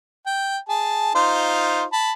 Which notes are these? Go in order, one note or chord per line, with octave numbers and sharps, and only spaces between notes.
G5
G#4 A5
D#4 F4 C5
A5 B5